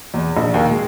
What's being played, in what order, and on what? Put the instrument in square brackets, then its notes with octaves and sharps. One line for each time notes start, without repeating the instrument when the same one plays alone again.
[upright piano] E2
A#1
D#2
G#3